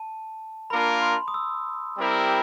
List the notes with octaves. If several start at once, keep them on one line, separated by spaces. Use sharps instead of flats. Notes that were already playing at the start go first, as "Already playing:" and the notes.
Already playing: A5
A#3 D4 F4 A#4 B5
C6
D#6
E6
G3 C4 E4 G4 A#4